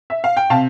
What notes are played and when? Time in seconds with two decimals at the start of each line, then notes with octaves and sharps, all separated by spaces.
0.10 E5
0.24 F5
0.37 G5
0.50 C3 F5 A5